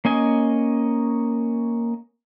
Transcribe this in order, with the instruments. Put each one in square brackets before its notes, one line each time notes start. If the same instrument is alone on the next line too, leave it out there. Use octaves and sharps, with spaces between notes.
[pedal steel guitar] A#3 C#4 D#5 G#5